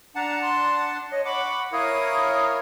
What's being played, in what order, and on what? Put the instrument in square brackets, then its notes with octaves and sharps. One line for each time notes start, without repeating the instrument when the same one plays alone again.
[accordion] D4 F#5 A5 [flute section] A#5
[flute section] C6
[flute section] C#5 [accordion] D#5
[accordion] F#5 D6 [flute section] B5 C#6
[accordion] E4 A#4 C#5 [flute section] F5 D#6